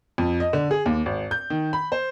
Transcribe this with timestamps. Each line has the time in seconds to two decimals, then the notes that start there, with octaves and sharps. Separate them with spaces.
0.18 F2
0.40 D#5
0.53 D3
0.71 G#4
0.86 D#2
1.06 G#1
1.31 G6
1.50 D#3
1.73 B5
1.92 C5